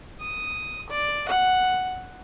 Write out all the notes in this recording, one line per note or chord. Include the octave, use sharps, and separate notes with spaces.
D#6
D5
F#5